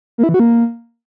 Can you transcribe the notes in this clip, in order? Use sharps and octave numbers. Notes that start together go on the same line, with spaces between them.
A#3
E4
E3
F#4
A#3